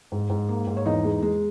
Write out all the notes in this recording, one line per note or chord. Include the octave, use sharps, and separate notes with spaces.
G#2
G#2
A#3
G#2
C#5
E2 D#4 D#5
G#3
G#3